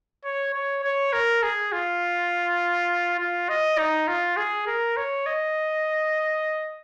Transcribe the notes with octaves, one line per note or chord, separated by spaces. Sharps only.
C#5
C#5
C#5
A#4
G#4
F4
F4
D#5
D#4
F4
G#4
A#4
C#5
D#5